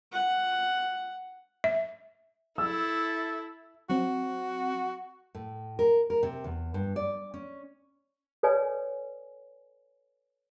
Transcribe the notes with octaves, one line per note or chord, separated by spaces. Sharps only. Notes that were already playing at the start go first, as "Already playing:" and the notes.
F#5
E5
E4 A4 E6
F#3 C4 F#4
A2
A#4
A#4
C3
E2
G2
D5
C#4
A4 B4 C#5 D5 G#5